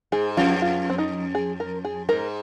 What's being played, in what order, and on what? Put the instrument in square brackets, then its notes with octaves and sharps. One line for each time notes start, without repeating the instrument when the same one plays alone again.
[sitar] G#2 [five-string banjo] G#4
[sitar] F2 [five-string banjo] F4
[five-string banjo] F4
C4
D#4
G#4
A#4
G#4
[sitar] G#2 [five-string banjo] A#4